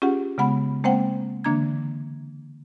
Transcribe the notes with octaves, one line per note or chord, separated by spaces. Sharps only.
C#4 F4 G4 G#4 F#5
C#3 G#3 B3 F#5 B5
G#3 A#3 C4 C5 F#5 G5
D3 E3 A#3 D4 A#5 G#6